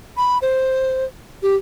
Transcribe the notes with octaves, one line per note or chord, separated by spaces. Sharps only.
B5
C5
G4